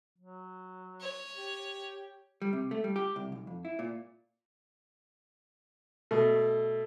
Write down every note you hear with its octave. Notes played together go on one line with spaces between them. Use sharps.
F#3
C#5
G4
G3
C3
A3
G3
G4
C2
B1
F2
E4
A#2
B2 A3